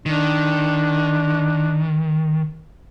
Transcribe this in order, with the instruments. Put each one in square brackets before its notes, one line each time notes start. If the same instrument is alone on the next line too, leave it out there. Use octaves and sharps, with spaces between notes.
[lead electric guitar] D#3 [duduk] D4